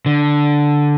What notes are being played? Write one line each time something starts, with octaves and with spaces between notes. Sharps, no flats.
D3